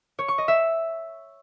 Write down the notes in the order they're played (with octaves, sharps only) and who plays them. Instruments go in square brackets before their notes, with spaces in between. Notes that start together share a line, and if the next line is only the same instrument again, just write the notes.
[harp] C#5
C#6
D#5
E5